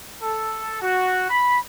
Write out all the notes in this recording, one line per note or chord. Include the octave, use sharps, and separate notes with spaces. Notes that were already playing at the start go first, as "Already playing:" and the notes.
A4
F#4
B5